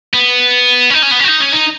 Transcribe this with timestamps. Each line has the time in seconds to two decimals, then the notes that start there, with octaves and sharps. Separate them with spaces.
0.14 B3
0.90 C#4
0.94 D#4
1.03 C#4
1.12 B3
1.20 C#4
1.25 F#4
1.29 D#4
1.41 C#4
1.53 D#4